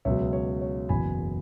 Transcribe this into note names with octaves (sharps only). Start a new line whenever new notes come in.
C#2 B2 F#3 C#5 E5
C#5
C#5
F#1 E2 B2 G#5 B5